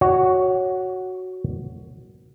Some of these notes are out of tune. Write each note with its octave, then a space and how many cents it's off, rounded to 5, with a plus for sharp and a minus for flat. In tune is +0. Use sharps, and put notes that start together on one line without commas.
F#4 +0 C#5 +0